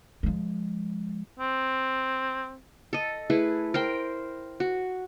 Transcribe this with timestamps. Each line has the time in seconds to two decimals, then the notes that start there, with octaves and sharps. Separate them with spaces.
0.23 F3 G#3
1.39 C4
2.93 A4 D#5
3.30 A3 E4 G#4 B4
3.74 A#4 C5 G5
4.60 F#4